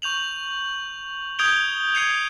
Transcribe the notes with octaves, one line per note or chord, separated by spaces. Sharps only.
C#6 G6 F7 F#7
D#6 G6 G#6 D7 F7 G7
G6 G#6 C7 C#7 D#7 F7